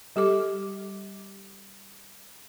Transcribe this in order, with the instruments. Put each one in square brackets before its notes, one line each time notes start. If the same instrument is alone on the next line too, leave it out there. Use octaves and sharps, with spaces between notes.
[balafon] G3 G4 A4 D6